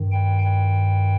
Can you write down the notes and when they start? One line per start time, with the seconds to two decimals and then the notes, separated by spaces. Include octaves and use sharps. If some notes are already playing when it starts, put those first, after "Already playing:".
Already playing: G2 D#3
0.12 G5
0.42 G5